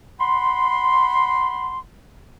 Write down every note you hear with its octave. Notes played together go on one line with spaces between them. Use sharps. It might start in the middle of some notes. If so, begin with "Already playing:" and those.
F#5 B5 C6